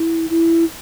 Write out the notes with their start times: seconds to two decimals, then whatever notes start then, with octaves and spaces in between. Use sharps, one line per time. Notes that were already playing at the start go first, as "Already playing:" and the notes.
Already playing: E4
0.30 E4